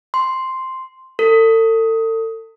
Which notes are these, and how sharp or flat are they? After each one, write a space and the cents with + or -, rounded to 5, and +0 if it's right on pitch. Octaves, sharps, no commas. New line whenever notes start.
C6 +0
A4 +35